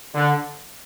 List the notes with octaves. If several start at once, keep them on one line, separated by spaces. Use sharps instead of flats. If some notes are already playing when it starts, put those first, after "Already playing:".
D3